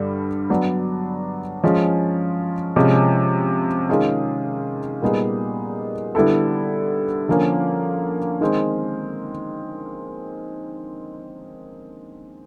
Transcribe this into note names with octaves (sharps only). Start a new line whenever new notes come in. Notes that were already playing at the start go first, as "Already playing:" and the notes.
Already playing: G2 D3 G3
F#3 B3 D4
F3 G#3 C#4 F4
C3 F3 G#3 C#4
D#3 G#3 C#4 F4 G#4
A#2 G3 B3 D#4 G#4
D3 G3 B3 E4 A4
D3 F3 A#3 C#4
D#3 G#3 C4